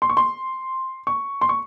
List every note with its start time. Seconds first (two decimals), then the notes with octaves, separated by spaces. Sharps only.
0.02 C6
0.10 C#6
0.17 C6
1.07 C#6
1.41 C6
1.49 C#6